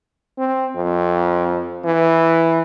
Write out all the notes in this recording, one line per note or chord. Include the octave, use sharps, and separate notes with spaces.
C4
F2
E3